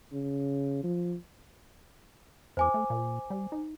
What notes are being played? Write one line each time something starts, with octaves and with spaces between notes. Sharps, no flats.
C#3
F3
E2 C5 G#5 D6
A3
A#2
G3
D#4